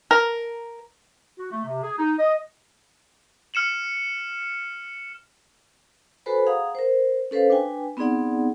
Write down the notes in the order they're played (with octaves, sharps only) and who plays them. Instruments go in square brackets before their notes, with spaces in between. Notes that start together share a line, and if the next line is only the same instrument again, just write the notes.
[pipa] A#4
[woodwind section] F#4
A3
C3
G#4
D#4
D#5
[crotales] F6 C#7 E7 F#7
[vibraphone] F#4 A4 B4 C5 G#5 B5
G#4 F5 F#5 A#5 D#6
A#4 C5
C#4 A4 B4 C5 F5
D4 B4 G5 G#5
B3 C4 D#4 G#4 D5 F#5